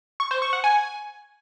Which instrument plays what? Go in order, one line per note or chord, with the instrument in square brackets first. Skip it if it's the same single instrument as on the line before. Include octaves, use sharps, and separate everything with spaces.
[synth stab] C#6
C5
C#6
F#5
G#5